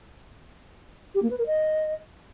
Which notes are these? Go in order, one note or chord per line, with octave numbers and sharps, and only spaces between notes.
G4
A#3
B4
A#4
D#5